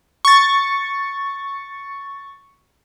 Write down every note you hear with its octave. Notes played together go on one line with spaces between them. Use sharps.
C#6 A6